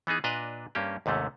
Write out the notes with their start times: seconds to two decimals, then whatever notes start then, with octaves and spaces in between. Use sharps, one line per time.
0.07 E3 B3 D#4 G#4
0.24 A#2 D4 B4 D#5 A#5
0.75 G2 A#3 C#4 G4
1.06 D#2 G#2 C3 A3 C#4